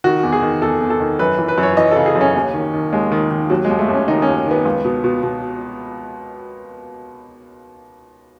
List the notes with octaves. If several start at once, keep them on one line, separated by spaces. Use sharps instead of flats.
D#3 F#4
E2
G#4
D#3
E2 A4
E2
A4
D#3
F#2 B4
E3
B4
F#2
C#5
E3 D#5
C#3 A4
G#4
F#2
C#4
D#2
D#3
D#3
D#2 G#3
D#3
D#3
D#2 F#3
G#3
D#2
A3
D#2 C#4
D#3 D#4
C#4
D#2
D#3 B3
C#2
B2
B2
B2